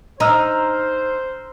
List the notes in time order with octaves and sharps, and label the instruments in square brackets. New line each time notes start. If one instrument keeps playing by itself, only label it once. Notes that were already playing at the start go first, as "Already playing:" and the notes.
[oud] D#4 [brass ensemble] C5 [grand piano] A#5 E6 F6